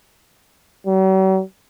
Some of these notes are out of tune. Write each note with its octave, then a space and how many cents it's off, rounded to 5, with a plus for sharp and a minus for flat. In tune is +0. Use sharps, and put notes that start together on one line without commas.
F#3 +45